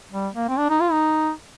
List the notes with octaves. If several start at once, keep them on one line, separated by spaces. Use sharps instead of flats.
G3
A#3
C4
D4
D#4
F4
D#4